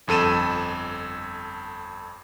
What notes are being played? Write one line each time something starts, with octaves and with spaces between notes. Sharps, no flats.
G1 F2 A4 D#7 E7